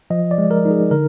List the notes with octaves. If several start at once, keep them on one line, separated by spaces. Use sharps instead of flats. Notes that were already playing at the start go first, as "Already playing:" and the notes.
F3 D#5
D5
G#3
A#4
D#4
G#4
D3 A#4